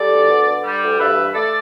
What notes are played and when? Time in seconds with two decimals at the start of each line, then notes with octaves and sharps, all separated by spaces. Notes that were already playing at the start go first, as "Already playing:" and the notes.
Already playing: G3 A4 D5
0.12 D2
0.29 B3
0.47 D3
0.64 G3
0.82 D2
0.99 G2 B4 E5
1.17 E3
1.34 A3 A4 D5